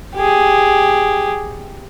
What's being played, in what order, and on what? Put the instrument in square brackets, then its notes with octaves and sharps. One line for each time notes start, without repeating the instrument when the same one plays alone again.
[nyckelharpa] G4 G#4